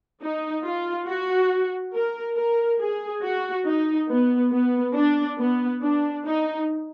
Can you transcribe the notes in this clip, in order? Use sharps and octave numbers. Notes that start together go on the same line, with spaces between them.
D#4
F4
F#4
A#4
A#4
G#4
F#4
D#4
B3
B3
D4
B3
D4
D#4